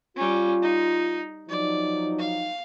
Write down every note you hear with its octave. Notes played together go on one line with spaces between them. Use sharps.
G3 C#4 F4
D#4
F3 F#3 D#4 D5
F5